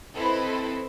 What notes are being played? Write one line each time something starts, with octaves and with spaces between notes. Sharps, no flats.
C4 E4 A4 B4 C5 D#5